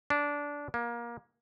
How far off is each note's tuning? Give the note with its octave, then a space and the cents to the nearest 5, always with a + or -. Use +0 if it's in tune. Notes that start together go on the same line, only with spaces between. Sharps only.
D4 -15
A#3 +25